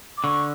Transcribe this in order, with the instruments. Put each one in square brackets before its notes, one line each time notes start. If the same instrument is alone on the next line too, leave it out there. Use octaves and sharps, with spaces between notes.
[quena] D6
[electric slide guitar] D3 [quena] C#6